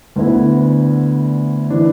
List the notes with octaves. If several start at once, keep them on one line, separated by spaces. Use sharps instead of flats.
D2 D3 B3 E4
E3 D4